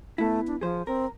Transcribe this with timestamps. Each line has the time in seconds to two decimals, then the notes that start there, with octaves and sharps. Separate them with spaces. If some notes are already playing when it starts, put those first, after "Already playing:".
0.18 A3 B3 E4
0.47 D4
0.61 F3 G#4 C5
0.87 C4 A#4